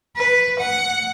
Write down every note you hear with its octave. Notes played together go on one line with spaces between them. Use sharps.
B4
F#5